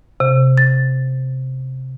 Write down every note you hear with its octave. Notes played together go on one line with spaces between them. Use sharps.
C3
A6